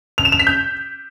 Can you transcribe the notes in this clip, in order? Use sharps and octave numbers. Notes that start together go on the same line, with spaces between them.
F7
E7
F7
B6
G6